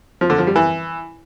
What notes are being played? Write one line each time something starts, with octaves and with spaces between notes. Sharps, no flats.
F3
D3
F3
G3
E3